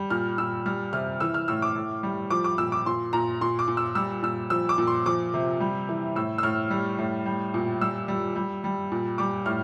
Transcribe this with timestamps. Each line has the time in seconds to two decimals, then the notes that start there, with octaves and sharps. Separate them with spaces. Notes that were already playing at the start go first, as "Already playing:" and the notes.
Already playing: G3
0.10 A#2 F6
0.38 A#2 E6
0.66 G3 F6
0.93 C3 F6
1.20 E3 E6
1.34 F6
1.48 A2 E6
1.62 D6
1.76 A2
2.03 G3
2.30 F3 D6
2.44 D6
2.58 A#2 E6
2.72 D6
2.86 A#2 C6
3.13 A#2 A#5
3.41 A#2 C6
3.59 D6
3.68 A#2
3.77 E6
3.95 G3 E6
4.23 A#2 E6
4.50 F3 E6
4.69 D6
4.78 A#2
4.87 C6
5.06 F3 D6
5.34 C3
5.60 G3
5.89 E3
6.15 A2 E6
6.38 E6
6.43 A2 F6
6.71 G3
6.98 A2
7.26 G3
7.54 A#2
7.81 G3 E6
8.08 G3
8.36 G3
8.64 G3
8.92 A#2
9.18 G3 D6
9.46 A2 F6